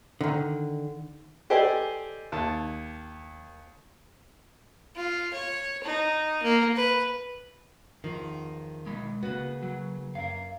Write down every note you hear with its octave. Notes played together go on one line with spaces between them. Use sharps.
D3 D#3
G4 A4 C5 D5 D#5 G#5
D#2 A5
F4
C#5
D#4
A#3
B4
E2 D#3 F3
B1 G#3 B5
C#3 A#3 B3 F#4
F#3
F#2 A#4 F5